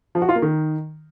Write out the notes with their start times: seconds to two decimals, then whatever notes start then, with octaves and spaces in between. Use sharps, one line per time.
0.15 F3
0.22 F#4
0.29 F4
0.36 A#3
0.42 D#3